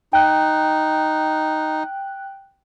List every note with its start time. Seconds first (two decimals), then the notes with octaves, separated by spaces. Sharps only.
0.13 D#4 G5 F#6